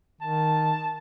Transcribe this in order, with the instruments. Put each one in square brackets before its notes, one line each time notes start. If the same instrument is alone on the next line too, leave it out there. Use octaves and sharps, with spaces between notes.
[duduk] D#3 [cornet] A5